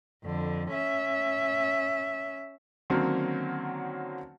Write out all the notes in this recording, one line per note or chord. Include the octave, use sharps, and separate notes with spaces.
F2 D3
C#4 E5
D3 D#3 F#3 A#3 C4 C#4